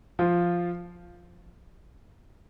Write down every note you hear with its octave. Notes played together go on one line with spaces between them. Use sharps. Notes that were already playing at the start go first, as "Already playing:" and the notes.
F3 F4